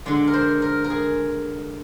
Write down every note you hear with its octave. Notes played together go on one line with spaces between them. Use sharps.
D3 G#3 D5
A#4
C5
A#4
A#4
G#4